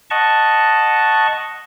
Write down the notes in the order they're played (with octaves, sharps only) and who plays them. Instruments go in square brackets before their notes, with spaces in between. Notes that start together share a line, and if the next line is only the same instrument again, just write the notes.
[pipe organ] D#5 F#5 A5 C#6